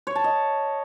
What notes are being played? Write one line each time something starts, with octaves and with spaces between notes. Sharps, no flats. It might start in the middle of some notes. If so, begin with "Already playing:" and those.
C#5
A5
D#5